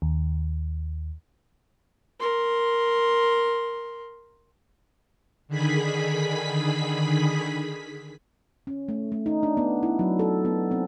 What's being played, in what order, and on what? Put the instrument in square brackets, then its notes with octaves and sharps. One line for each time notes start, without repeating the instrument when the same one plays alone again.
[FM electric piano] D#2
[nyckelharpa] A#4 C6
[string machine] D3 D#3 G#4 B5 B6
[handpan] C#4
A3
A3
D#4
D4
B3
E4
F#3
A4
B3
C4